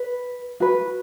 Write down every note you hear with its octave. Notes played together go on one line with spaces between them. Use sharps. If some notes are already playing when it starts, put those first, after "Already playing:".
Already playing: B4
F#4 B4